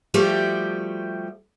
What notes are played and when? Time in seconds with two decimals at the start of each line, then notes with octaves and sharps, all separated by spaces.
0.14 F3 G3 A3 F#4 G4 D5